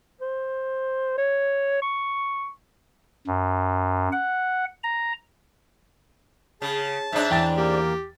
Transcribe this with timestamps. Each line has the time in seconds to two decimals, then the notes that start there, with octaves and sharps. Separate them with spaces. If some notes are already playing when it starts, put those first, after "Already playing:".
0.21 C5
1.18 C#5
1.82 C#6
3.27 F#2
4.12 F#5
4.84 A#5
6.62 C#3 G#4 A5
6.87 G#4
7.12 G#2 D4 E5
7.31 E2 G5 A6
7.57 A#3 G4